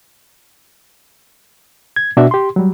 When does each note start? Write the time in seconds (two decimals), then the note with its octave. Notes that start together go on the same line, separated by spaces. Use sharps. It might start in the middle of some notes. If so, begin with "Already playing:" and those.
1.96 G#6
2.17 B2 D4 F#4 E5
2.31 G4 C6
2.56 F#3 G3